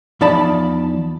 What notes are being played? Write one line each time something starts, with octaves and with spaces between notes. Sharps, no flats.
E2 F3 D#4 D5 A5 B5